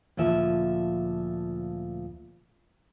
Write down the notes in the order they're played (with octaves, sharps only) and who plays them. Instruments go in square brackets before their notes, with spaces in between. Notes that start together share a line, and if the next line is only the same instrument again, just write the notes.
[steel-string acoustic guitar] D2 A#2 F3 E5 A5